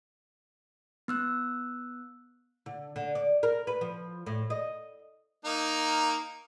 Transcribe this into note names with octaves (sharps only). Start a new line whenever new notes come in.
B3 E6 F#6
D3
D3
D5
A#4
B4
F3
A2
D#5
A#3 D#4